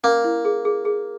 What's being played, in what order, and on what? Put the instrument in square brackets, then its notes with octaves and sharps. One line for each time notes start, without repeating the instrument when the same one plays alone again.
[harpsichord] A#3 [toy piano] C#4
[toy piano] E4
G#4
G#4
G#4